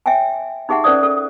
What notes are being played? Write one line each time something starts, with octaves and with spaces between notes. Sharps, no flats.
C#5 E5 G5 G#5
D#4 G4 G#4 E5 F#5
C#4 A#4 C5 D5 D#6
A4